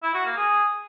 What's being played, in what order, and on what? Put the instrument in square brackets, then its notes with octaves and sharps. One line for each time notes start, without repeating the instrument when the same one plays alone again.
[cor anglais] E4
F#4
A#3
G#4